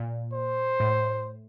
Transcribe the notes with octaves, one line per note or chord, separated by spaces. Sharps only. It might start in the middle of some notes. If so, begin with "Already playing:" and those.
Already playing: A#2
C5
A2